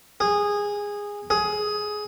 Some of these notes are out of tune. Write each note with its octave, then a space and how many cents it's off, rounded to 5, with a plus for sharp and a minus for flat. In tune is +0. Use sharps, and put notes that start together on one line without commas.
G#4 -15
G#4 +15